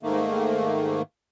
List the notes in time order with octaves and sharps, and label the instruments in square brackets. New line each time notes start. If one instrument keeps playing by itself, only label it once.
[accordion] G#2 D#3 A3 A#3